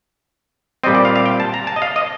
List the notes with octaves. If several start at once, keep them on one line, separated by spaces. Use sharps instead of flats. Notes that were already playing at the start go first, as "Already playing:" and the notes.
A#2 G3 C4 D#5
D5
F5
F5
G5
A5
A#5
A5
D#5
F5
D#5